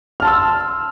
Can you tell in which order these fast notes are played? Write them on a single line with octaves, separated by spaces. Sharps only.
F6 A5 C6 E6